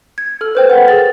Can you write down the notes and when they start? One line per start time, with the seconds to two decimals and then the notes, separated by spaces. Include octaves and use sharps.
0.18 G#6
0.41 A4 F6
0.55 B4 C5 G5
0.70 A#4 F#5
0.88 G#4 A6